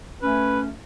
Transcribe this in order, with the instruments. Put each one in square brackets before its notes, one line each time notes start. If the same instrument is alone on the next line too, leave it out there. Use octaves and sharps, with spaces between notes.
[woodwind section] A3 C#4 [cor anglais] B4